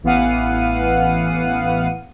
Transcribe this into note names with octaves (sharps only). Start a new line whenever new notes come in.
A1 E3 B3 F5 F#5 D#7